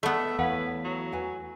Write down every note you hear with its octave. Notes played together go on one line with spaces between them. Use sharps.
A3 B3 D#5 E5 B5
E2 B4 C#5 F5 F#5
F#3
F#4 B4 G#5